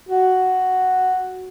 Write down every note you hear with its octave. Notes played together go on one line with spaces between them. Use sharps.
F#4